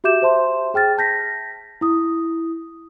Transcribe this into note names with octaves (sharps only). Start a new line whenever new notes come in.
F#4 G4 E5 D6 G6 E7
C5 E5 A5 C6
G#4 G5 F6 A6
A5 G6 A#6 B6
E4 D#6